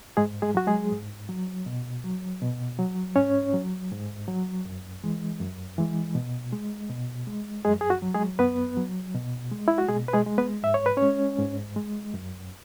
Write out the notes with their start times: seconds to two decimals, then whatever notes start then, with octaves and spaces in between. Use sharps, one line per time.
0.17 G#2 G#3 G#4
0.42 G#3 G#4
0.55 F#3 F#4
0.67 G#3 G#4
0.91 G#2
1.29 F#3
1.66 B2
2.04 F#3
2.42 B2
2.79 F#3
3.16 G#2 C#4 C#5
3.54 F#3
3.92 G#2
4.28 F#3
4.65 F#2
5.04 E3 G#3
5.41 F#2
5.78 E3 G#3
6.15 B2
6.52 G#3
6.90 B2
7.27 G#3
7.65 F#2 G#3 G#4
7.81 G#4
7.90 F#4
8.02 F#3
8.14 G#3 G#4
8.39 F#2 B3 B4
8.77 F#3
9.15 B2
9.51 G#3
9.68 E4
9.78 F#4
9.88 B2 G#3 G#4
10.08 B4
10.13 G#3 G#4
10.26 G#3
10.38 B3 B4
10.63 G#2 E5
10.74 C#5
10.86 B4
10.97 G#3 C#4 C#5
11.39 G#2
11.76 G#3
12.14 F#2